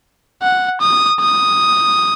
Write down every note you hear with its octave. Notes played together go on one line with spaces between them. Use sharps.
F#5
D#6
D#6